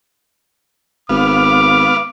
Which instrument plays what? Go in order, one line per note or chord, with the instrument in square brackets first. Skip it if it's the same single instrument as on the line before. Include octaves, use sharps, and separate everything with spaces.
[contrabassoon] G#1 [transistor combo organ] B3 F5 [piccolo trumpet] D6